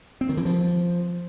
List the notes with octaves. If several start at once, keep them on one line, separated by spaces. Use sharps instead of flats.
C4
D#3
E3
F3